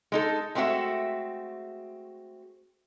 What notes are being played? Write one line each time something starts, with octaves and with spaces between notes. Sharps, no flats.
G#3 D#4 A4
G#3 A3 C4 F#4 E5